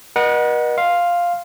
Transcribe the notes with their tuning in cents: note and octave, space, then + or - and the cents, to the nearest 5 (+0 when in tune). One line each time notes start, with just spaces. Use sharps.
B4 -45 D#5 -25 F#5 +0
F5 +0 C6 +10